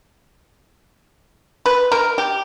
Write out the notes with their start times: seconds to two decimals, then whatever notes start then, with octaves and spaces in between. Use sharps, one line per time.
1.66 B4
1.92 A#4
2.18 G4